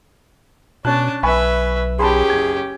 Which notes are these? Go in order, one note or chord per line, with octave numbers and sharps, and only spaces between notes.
B2 C#4 D4 A5 F#6
B1 B4 E5 G#5 B5 C#6
C#4 G4 G#4 A5 B5 C6
F#1 G#6